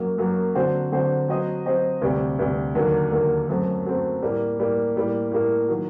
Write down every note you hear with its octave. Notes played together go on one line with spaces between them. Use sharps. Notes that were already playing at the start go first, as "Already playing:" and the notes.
Already playing: F#2 F#3 A#3
F#2 F#3 A#3
D3 F#3 C4 F#4 C5
D3 F#3 C4 F#4 C5
F#3 C4 F#4 C5 D#5
F#3 C4 F#4 C5 D#5
D2 C3 G3
D2 C3 G3
D#2 D3 F#3 A#3
D#2 D3 F#3 A#3
F#2 F#3 A3 C4
F#2 F#3 A3 C4
A2 G3 A#3
A2 G3 A#3
A2 G3 A#3
A2 G3 A#3
D#3 F#3